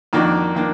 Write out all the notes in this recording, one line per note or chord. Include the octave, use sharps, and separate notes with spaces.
F2 D#3 A#3 D4 F#4
D#3 A#3 D4